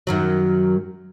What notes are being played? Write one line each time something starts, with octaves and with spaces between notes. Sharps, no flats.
F#2 D#3 F#3